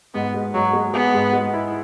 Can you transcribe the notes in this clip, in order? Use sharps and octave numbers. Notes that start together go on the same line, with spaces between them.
G#2 B3
G#3
G#2 F#3
G#3
B3 G#4
G#2
G#3
E4